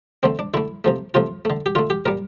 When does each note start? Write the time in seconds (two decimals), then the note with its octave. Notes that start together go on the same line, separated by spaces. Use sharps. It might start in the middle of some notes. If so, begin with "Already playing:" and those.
0.23 D3 A3 C4
0.39 D4
0.54 D3 A3 E4
0.84 C3 F3 A3
1.14 C3 F3 A3 F4
1.45 D3 A3
1.66 G4
1.75 D3 A3 F4
1.90 G4
2.06 A#2 G3 A#4